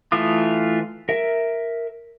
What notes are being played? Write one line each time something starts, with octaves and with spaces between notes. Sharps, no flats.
E3 A3 F4 D#6
A#4 E5